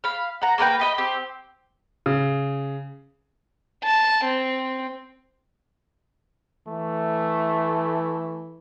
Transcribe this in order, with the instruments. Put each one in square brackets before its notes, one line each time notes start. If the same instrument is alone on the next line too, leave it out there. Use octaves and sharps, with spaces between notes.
[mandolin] F5 B5
F#5 A#5
A#3 A#4 B4 G5
G4 D#5 B5
C4 G4
[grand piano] C#3
[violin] A5
C4
[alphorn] E3 [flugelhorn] A3